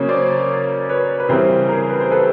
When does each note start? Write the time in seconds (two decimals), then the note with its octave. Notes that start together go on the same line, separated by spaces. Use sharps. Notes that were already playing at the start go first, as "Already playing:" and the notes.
Already playing: C#3 F#3 A#3 C#4 C#5
0.08 C5 D5
0.89 B4 C#5
1.20 B4
1.29 C#3 E3 G3 C4 A#4 C5
1.69 G#4 A#4
1.89 B4
2.00 C5
2.11 A4 B4